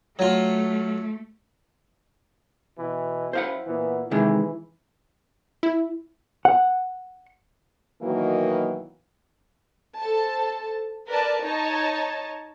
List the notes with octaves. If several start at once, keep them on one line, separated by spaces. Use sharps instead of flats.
F#3 A3 F4
B2 E3
F#2 E4 C5 F5 F#5
A#2 E3 B3
C3 D#3 E3 G#3
E4
F#5
B2 D#3 E3 F#3 A#3
A4 C5 A5
A#4 B4 D5 A5
D#4 C#5 D#5 A5